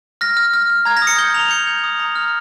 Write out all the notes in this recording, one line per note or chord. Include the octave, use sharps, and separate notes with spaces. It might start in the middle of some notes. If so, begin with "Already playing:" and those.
F6 A#6
F6
F6
F6
A#5 G#6
A#6
D#6
C#7
G6 G7
A#5 F7
G6 C#7
G6
D#6
A#5
F6